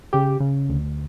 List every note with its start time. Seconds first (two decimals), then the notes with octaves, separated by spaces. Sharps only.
0.13 C#3 G4
0.40 C#3
0.69 D2